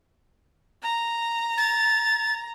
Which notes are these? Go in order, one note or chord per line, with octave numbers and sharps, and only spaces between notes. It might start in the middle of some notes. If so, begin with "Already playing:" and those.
A#5
A6